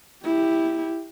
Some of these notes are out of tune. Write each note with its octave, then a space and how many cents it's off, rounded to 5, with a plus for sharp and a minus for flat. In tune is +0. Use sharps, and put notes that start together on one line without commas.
E4 +0 G4 +5